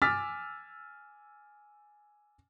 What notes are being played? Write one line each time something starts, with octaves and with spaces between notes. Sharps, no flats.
G#5 D6 E6 F6 A6 B6